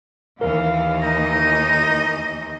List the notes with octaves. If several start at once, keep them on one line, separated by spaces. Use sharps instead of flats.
D#2 E3 A#4 F5
D#4 D#5